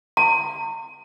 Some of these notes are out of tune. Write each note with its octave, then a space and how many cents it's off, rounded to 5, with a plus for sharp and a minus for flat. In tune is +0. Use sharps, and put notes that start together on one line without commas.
A#5 -40